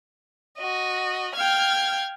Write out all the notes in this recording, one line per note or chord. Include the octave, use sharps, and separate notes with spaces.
F#4 D#5
F5 G5 F6 G#6